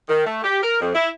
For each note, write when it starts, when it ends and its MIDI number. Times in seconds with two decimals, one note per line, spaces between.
0.09 0.25 51
0.26 0.42 57
0.43 0.59 67
0.63 0.79 70
0.81 0.90 41
0.95 1.09 64